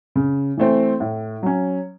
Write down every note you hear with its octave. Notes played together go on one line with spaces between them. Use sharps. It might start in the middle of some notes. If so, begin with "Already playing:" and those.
C#3
E3 A3 C4
A2
F#3 C#4